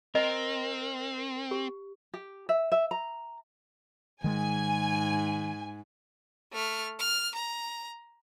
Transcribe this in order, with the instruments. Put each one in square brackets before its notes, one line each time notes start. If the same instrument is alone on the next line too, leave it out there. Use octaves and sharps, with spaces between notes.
[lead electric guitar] C4 [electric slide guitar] A#4 [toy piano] D#5
[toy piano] G4
[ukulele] G4
E5
E5
A#5
[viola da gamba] G#2 [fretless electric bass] D#3 G#3 [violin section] G#5
[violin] A3 F6
F6
A#5